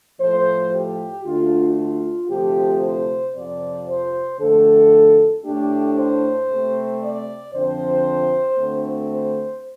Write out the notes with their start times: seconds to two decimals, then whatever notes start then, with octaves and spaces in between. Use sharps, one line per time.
0.20 A2 F3 A3 C5
0.73 G4
1.24 D2 D3 A3 D4 F4
1.78 F4
2.29 D2 C3 F3 A3 G4
2.82 C5
3.34 F2 C3 F3 D5
3.88 C5
4.40 F2 D3 A3 A4
5.44 A2 A3 D4 G4
5.96 C5
6.48 C3 A3 C4
7.02 D5
7.53 F2 D3 F3 C4 C5
8.58 D2 D3 A3 C4
9.11 C5